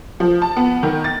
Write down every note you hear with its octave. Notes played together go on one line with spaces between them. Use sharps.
F3
A5
B3
D#3
A6